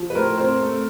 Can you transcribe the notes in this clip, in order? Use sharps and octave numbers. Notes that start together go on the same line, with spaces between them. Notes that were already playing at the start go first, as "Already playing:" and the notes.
Already playing: F3
B4
A2 A#4 C5
C4 A#4 C5
A3